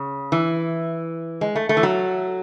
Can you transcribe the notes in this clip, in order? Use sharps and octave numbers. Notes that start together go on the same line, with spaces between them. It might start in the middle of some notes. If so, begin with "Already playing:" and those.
Already playing: C#3
E3
G#3
A3
A3
E3
F#3